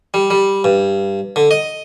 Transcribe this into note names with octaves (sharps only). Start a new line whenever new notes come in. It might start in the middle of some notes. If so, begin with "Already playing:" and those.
G3
G3
G2
D3
D#5